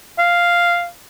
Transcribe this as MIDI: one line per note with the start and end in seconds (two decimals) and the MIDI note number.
0.19 0.87 77